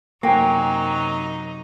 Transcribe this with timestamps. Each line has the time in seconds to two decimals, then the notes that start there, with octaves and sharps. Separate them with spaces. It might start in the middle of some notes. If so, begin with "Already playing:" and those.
0.23 F#2 C3 F#3 A#3 D#4 C5 G5 G#5